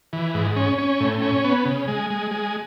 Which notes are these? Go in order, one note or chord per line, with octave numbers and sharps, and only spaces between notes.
E3
G#2
C#4
C#4
A2
C#4
B3
C#3
G#3
G#3
G#3